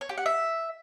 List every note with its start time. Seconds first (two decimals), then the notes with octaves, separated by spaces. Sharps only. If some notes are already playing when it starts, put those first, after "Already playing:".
0.01 C#5
0.09 G4
0.18 F#5
0.26 E5